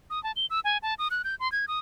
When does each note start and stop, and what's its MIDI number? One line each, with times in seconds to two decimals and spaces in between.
0.10 0.22 87
0.24 0.32 81
0.36 0.46 103
0.50 0.60 88
0.64 0.78 80
0.83 0.94 81
0.99 1.08 87
1.11 1.22 90
1.24 1.35 91
1.40 1.50 84
1.52 1.66 92
1.68 1.79 87